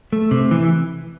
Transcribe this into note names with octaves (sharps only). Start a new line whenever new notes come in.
A3
C3
E3